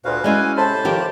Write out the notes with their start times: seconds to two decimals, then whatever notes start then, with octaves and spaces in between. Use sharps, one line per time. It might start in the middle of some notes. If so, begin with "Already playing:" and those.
0.05 D2 A#2 F#4 B4 F5
0.24 G#3 C#4 E4 D5 G#5
0.57 A2 C3 C5 A5 B5 C6
0.85 D#3 F3 G4